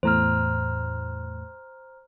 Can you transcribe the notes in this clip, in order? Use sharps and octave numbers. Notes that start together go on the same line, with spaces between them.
E2 A2 C5 A#5 F6